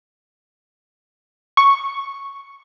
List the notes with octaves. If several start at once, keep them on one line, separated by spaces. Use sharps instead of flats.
C#6